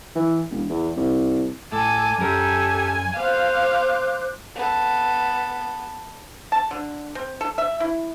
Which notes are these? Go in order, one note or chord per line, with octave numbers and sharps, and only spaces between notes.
E3
E1
E2
C2
A2 A4 G#5 D6 G#6
F#2 C#4 G4 A4 A#4 G#5
B3 C5 F5 D6 F#6
B3 A4
A5
D3
C4
A4
E5
E4